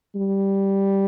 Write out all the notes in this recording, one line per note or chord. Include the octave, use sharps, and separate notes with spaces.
G3